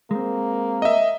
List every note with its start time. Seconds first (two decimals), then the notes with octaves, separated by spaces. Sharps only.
0.11 G#3 A#3 C4
0.82 D#5 E5